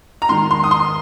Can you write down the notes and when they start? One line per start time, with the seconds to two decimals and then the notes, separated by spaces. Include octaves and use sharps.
0.22 A#5
0.29 G#2 D#3 C6
0.51 C6
0.64 D#6
0.71 C6